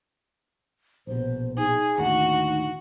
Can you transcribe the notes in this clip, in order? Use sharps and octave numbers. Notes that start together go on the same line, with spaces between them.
A#1 B2 C5
D#4 G#4
D#2 A2 D3 F#4